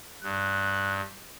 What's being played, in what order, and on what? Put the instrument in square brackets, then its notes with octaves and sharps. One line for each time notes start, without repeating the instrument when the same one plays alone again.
[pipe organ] G2 [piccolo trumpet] F#6